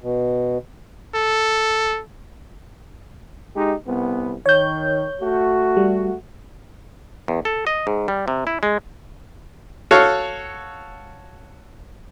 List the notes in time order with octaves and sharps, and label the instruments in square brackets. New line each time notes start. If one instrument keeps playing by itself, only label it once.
[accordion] B2
[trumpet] A4
[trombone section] G#3 D#4 G4
C2 B3
[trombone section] D#3 [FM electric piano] C#5 G6
[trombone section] A3 F#4
[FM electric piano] G3
[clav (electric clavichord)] E2
A4
D#5
G#2
G3
C3
E4
G#3
[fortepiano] F#4 A4 C#5 F5